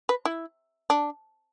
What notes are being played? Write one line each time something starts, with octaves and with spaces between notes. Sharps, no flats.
B4
E4
D4